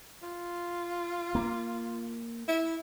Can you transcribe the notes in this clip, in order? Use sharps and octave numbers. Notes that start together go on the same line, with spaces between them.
F4
A#3
E4